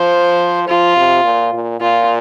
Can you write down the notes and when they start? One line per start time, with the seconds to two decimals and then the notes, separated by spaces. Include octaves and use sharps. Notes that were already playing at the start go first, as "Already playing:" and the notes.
Already playing: F3 C5
0.68 F3 F4
0.97 C3
1.24 A#2
1.53 A#2
1.81 A#2 F4